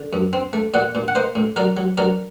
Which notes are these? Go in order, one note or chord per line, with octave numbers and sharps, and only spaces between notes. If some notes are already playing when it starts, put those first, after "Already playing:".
Already playing: D3
F#2
C4
A3
A#2 D5 F#5
A#2
F#5
A#3 C5 D#5
A2
F#3 A#4 D5
F#3
F#3 A#4 D5